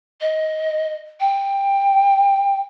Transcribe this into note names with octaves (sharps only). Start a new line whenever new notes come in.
D#5
G5